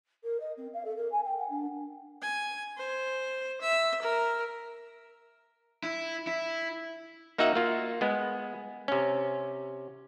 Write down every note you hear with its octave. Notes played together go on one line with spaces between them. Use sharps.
A#4
D#5
C4
F5
A4
A#4
G#5
G5
F#5
D4
G#5
C5
E5
A#4
E4
E4
A#3 D#4 F#4 E5 F#5
A#3 F4
G#3 B3
C3 C#4